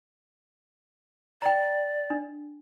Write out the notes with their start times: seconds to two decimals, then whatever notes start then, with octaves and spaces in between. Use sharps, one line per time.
1.42 D5 G5 A#5
2.10 D4